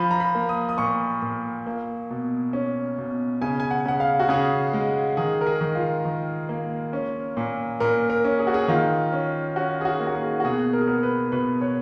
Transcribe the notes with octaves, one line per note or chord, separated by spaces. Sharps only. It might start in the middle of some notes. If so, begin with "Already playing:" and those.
Already playing: F3 B5
A#5
B5
A#3
D#6
D#6
A#2 C#6
A#2
A#3
B2
C#4
B2
C#3 G#5
G#5
F#5
C#3 F#5
F5
F#4
C#3 G#4
G#3
D#3 G#4
A#4
G#4
D#3
F4
D#3
A#3
C#4
A#2
A#2 A#4
A#4
C#4
G#4
F#4
G#4
D#3 F4
C#4
C#4 F#4
G#4
F#4
A#3
F#4
G#4
F#4
B2 G#4
A#4
G#4
B3 A#4
B4
B2 B4
C#5